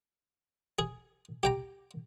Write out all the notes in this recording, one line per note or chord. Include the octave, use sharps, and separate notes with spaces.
G#4
G4 G5 A#5